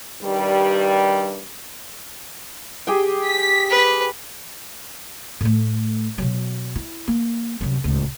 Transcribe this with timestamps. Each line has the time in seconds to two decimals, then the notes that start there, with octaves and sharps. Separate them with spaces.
0.22 G2 D#3 G3
2.87 G4 G#4 G5
3.27 B6
3.70 B4
5.41 A2 A3
6.18 B2 F#3
6.76 E4
7.08 A#3
7.61 C2 F#2
7.84 D1 C#2